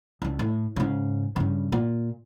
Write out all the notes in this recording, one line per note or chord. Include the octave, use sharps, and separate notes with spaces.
C#2 D4
A2
G#2 C#3
G2 C#3
A#2